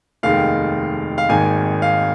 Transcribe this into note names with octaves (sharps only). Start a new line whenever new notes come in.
F1 D#2 D#3 G#3 F5
F5
G#1 G#2 D#3 A#3 G#5
F5